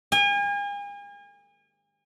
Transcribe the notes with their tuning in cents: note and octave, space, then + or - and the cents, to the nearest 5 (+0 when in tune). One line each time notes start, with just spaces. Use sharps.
G#5 -40